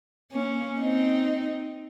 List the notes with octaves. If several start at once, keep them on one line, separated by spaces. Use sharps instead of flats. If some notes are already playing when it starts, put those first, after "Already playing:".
A#3 C#4
C4 D#4